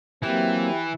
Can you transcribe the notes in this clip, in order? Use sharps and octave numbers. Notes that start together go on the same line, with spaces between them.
E3 F#3 A#3 C4 G4 E5 G5